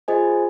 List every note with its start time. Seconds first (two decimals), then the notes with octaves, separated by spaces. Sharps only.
0.08 F4 G#4 C5 D#5 G#5